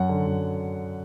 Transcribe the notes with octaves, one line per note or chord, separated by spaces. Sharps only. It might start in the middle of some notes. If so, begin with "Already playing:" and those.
Already playing: F#2 F#3 F#5
D3
F#2